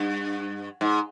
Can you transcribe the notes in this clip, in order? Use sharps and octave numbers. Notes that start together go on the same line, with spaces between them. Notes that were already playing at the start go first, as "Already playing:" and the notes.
Already playing: G2
G#2